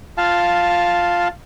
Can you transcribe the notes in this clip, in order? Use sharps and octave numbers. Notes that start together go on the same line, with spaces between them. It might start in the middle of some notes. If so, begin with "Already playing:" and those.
F4 F5 A5